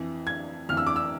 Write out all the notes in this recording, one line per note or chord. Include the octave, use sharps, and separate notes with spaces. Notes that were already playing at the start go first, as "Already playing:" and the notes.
Already playing: F2 E3
G#6
F2 E3 F6
E6
D6
E6